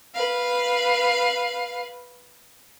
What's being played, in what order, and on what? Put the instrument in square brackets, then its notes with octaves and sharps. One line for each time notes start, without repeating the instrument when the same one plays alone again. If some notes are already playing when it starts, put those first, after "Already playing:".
[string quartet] B4 F5